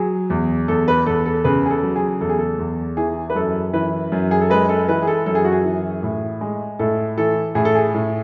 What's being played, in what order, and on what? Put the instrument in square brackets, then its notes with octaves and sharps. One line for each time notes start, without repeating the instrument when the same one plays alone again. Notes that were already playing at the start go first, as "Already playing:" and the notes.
Already playing: [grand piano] F#3 G#4
E2
E2 A4
B4
E2 A4
A4
C#3 B4
G#4
A4
F#3
G#4
E2 A4
G#4
A4
E2
E3 G#4
B4
F#2 A4
E3 B4
F#2
G#4
A4
G#3 B4
A4
E3 B4
G#4
A4
F#2 A4
G#4
F#4
G#4
E3
A2
G#3
A2 A4
E3 A4
A2 G#4
A4
G#4
A2